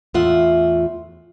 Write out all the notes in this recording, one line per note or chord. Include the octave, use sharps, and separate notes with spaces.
E2 A2 F4 E5 F#5